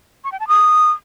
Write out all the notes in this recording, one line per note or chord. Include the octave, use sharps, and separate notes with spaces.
C#6
G5
A5
D#6